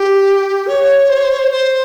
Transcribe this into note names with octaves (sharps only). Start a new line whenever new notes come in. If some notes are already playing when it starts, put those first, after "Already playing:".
Already playing: G4
C#5
C5
C#5
C5
C#5
C5
C5